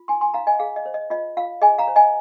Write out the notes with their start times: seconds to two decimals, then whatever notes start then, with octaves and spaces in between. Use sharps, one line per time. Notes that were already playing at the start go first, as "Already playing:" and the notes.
Already playing: F4
0.08 D#4 G#5 C6
0.21 G#5 C6
0.34 D#4 F5 A#5
0.47 D#5 G#5
0.60 G#4 F5
0.76 D#5
0.86 C5
0.94 D#5
1.10 F4 D#5
1.37 F4 F5
1.62 G#4 D#5 G#5
1.78 F5 A#5
1.88 C5
1.96 D#5 G#5